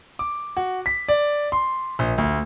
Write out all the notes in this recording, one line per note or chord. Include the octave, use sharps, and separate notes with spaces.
D6
F#4
B6
D5
C6
A#1
D2